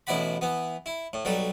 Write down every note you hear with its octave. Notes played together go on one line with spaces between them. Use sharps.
A1 B2 E4 D5 F#5 B5
E3 B3
E4
A2
B1 F#3 G3 A4